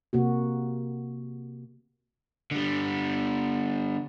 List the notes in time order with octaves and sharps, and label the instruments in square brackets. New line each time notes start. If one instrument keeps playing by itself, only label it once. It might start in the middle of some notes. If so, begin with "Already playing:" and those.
[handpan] C3 A#3 F#4
[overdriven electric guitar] D3 G3